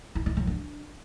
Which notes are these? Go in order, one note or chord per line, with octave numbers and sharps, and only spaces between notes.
E4
E4
F#3
D4